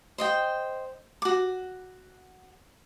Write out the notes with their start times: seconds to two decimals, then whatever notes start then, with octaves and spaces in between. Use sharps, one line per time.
0.18 C5 D#5 G5
1.22 F#4 D6